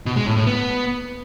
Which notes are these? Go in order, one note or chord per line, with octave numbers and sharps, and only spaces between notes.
B2
G#3
A2
A2
B3